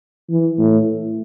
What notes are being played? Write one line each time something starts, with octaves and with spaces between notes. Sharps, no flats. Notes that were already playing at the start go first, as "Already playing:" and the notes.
E3
A2